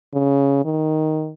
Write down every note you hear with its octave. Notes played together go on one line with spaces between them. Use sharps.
C#3
D#3